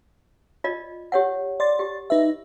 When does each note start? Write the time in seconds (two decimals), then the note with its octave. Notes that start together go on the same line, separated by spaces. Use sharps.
0.64 F4 D5 D#5
1.12 G4 C#5 F#5
1.60 D5 C6 A6
1.79 G4
2.10 D#4 B4 E5